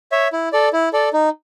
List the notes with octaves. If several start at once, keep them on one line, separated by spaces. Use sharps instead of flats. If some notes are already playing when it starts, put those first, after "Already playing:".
C#5 E5
E4
A4 D5
E4
A4 D5
D#4